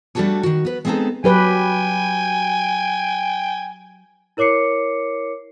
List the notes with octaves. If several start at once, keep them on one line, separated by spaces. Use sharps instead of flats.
G3 A3 D4 F#4 A4 C#5
D#3 F#4
B3 B4
G#3 B3 C4 D4 D#4 A4
F#3 G4 B4 G5 G#5
E4 A#4 C#5 D6 C7 C#7